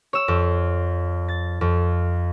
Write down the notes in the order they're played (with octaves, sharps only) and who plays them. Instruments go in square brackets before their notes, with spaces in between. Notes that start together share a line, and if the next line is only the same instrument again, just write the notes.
[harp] C#5 E6
F2
A6
F2